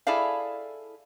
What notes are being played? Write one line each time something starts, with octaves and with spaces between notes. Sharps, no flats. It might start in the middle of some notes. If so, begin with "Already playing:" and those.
E4 G#4 A4 D5 F5